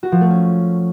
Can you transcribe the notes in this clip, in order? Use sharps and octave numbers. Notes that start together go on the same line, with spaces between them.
F#4
F3
A3
C#4